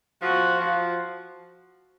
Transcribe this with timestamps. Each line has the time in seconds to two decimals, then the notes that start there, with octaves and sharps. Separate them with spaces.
0.22 F3 F#4
0.60 F3